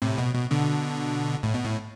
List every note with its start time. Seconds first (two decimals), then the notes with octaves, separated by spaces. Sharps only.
0.02 A2 C3
0.18 B2
0.35 B2
0.50 B2 D3
1.43 A2
1.54 B2
1.64 A2